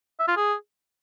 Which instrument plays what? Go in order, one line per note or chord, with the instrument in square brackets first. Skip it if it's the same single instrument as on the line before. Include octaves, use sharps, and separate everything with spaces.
[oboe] E5
F4
G#4